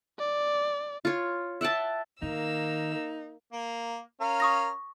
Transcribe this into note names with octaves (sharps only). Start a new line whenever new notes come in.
D5
F4 C#5
E5 F#5 G5 A5
D#3 A#3 D#4 E6
A#3
C#4 A#4 F5
C#6 D#6 A#6